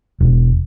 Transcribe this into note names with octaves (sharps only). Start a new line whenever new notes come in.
E1